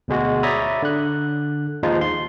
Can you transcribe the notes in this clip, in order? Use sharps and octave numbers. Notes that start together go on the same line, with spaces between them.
D2 B2 G#3 F#4
C#5 D5 E5 A#5 B5 D#6
D3 F#6
D#2 F3 G#3 D#4 F4
C6